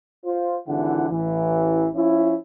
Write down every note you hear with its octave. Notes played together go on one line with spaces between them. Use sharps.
F4 C5
G#1 D3 E3 E4 F#5
A1 E3
F3 C#4 E4